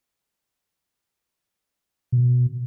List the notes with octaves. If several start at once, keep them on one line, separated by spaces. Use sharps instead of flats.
B2